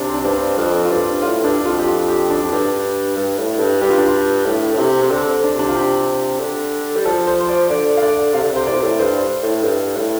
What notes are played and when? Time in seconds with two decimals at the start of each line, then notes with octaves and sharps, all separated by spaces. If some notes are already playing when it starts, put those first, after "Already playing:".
Already playing: C3 D4
0.08 C4
0.14 D4
0.25 G2 D4
0.36 C4
0.57 F2 C4
0.85 F4
0.90 G2 D4
1.22 A2 F4
1.44 G2 D4
1.65 F2 F4
1.79 G4
1.88 F4
2.09 G4
2.30 D4
2.42 F2
2.52 G2 D4
3.17 G2
3.39 A2
3.59 G2
3.81 G2 G4
3.90 F4
3.98 D4
4.06 F4
4.46 A2
4.74 A2
4.79 C3
5.02 C3
5.11 D3 C4
5.44 D4
5.55 C3 D4
5.68 F4
5.75 G4
6.40 D3
6.96 G3
7.05 F3 A4
7.27 C5
7.41 C5
7.49 D5
7.70 D3 D5
7.97 F5
8.03 D3 D5
8.34 C3 F5
8.44 D3
8.52 C3 C5
8.67 A2 D5
8.74 C3
8.82 A2
9.00 G2 C5
9.43 A2
9.64 G2
9.97 A2